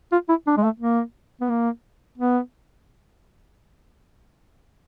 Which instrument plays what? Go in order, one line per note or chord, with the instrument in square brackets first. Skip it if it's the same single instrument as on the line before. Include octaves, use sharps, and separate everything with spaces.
[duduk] F4
E4
D4
G#3
A3
A#3
B3
A#3
B3